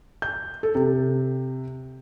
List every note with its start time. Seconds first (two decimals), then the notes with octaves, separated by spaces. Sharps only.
0.22 G6
0.63 A4
0.75 C3